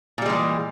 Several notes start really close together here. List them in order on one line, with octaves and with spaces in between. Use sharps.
A#2 G3 G#3 E3